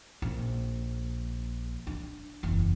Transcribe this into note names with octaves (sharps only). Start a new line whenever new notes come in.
A#1
D4
F#1 E2